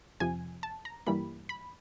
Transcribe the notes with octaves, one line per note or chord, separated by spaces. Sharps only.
F2 C3 F3 G#5
A5
A#5
G2 E3 G3 A#3 B5
B5